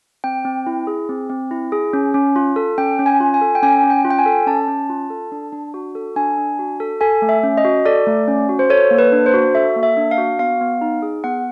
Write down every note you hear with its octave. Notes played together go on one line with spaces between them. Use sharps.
C4 G5
C4
E4
G#4
C4
C4
E4
G#4
C#4
C#4
F4
A4
C#4 G5
C#4
G#5
F4
G#5
A4
G5
C#4 G#5
C#4
G5
F4
G5
G#5
A4
C#4 A5
C#4
F4
A4
D4
D4
F#4
A4
D4 G#5
D4
F#4
A4
A4 G#5
A3
E5
C#4
D#5
F#4
A4 D5
A3
C#4
F#4
C5
A4 C#5
A#3
B4
D4
C5
F#4
A4 E5
A#3
E5
D4
F5
F#4
B3 F5
B3
D#4
G#4
B3 F#5